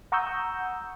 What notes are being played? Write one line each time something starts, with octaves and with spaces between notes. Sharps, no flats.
F#5 A#5 C#6 D#6 E6 G6